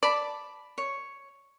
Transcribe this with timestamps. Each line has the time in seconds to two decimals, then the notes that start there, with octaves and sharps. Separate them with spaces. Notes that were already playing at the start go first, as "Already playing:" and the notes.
0.03 D5 A5 B5
0.78 C#5